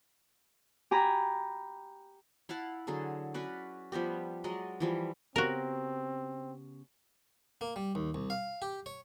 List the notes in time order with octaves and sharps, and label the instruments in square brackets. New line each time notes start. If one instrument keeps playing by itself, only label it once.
[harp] G4 G#5 A#5 B5
[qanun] E4 F5 F#5 A5
D3 F#3 G#4 A5
C#4 F#4 B4 D5
F3 G3 B3 G4
F#3 G#3 D5 D#5
E3 F3 G3
[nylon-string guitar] C#3 B3 G4 [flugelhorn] C4 [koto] F#4 A#4
[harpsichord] A#3
G3
D#2
C2
F5
G4
C#5